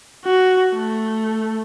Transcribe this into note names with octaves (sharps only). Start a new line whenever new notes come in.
F#4
A3